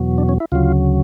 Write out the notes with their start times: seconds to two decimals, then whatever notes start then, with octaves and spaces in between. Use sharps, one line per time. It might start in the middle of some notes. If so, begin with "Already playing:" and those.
Already playing: E2 B2 F#3
0.18 D4
0.29 C#4
0.40 E4
0.52 D2 C#3 F#3 F4